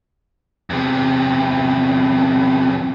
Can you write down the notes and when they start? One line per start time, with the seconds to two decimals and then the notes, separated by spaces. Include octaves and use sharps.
0.70 E2 C3